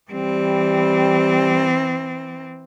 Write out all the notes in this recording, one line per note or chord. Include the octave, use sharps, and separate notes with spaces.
E3 G3 C4